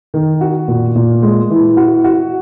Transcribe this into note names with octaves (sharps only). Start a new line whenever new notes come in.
D#3
F#4
A#2
A#2
G#3
E3
F#4
F#4